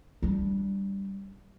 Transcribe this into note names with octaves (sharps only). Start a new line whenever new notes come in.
G3 D4